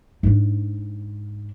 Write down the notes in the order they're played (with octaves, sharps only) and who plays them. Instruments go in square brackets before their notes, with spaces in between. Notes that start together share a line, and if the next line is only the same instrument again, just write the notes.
[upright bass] G#2 D4